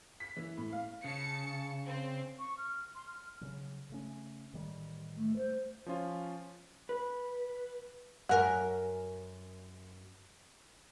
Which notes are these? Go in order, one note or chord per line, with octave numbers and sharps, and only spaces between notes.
B6
E3
A2
F5
C#3 A5 C#7
C4
C#6
F6
C6
F6
C#3 F#3
C#3 A3 C#4
A1 D#3 G3
A3
C5
F3 C#4 F4
B4
F#2 A4 A#4 C5 F#5 G#5